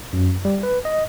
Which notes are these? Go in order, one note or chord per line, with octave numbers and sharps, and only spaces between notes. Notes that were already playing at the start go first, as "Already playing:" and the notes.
F#2
G3
B4
D#5